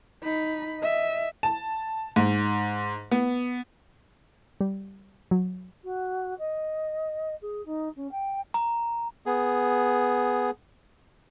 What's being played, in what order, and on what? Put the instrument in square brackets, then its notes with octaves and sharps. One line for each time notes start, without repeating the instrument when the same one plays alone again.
[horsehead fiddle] D#4 B5
D#5 E5
[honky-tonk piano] A5
G#2
B3
[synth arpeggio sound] G3
F#3
[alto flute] F#4
D#5
G#4
D#4
C#4
G5
[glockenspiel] A#5
[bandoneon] B3 G#4